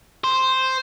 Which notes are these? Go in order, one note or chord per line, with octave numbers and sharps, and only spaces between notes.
C5